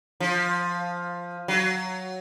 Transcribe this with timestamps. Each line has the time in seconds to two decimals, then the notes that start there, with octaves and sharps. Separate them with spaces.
0.20 F3
1.48 F#3